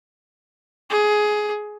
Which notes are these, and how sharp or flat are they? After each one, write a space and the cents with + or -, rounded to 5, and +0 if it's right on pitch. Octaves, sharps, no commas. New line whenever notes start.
G#4 +15